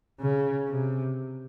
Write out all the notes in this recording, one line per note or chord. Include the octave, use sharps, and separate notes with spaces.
C#3
C3